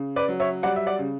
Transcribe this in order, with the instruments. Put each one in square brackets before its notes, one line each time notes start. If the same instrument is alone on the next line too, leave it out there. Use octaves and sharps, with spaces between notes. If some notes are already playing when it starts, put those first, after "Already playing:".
Already playing: [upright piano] C#3
B4 D5
F#3
C#5 E5
G3 D5 F#5
E5
D5 F#5
C#3